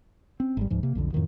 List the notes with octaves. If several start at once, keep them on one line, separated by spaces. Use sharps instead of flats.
C4 C#4
G#1 G3
D1 C#2 G#2 F3
C3 A#3
B1 F2 D3
F2 A2 D#3 F3